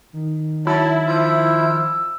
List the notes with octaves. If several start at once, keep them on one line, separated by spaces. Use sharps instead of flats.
D#3
F#3 E4 A5
F3 E6